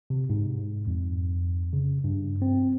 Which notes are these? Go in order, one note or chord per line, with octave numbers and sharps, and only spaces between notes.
C3
G#2
F2
C#3
G2
C4